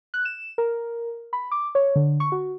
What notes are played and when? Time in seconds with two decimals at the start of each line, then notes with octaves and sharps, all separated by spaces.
0.14 F#6
0.25 E7
0.58 A#4
1.33 B5
1.51 D6
1.75 C#5
1.96 D3
2.20 C#6
2.32 F#4